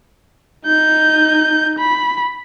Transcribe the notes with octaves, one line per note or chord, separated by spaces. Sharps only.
D#4 G6
B5